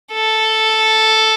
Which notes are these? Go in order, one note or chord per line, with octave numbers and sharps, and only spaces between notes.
A4